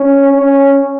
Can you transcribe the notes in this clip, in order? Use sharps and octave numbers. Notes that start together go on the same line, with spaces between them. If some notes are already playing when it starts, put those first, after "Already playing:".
Already playing: C#4
C#4